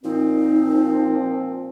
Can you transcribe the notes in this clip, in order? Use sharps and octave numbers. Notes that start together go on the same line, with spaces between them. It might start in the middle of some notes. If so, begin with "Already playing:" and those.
A#2 F3 C4 D#4